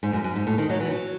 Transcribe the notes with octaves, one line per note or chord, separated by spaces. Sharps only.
G#2
F#2
F#2
G#2
A2
D#3
F#3
E3
F#3